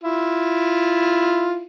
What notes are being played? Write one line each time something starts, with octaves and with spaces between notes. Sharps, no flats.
E4 F4